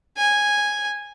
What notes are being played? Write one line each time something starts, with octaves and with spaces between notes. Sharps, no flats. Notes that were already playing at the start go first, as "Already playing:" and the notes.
G#5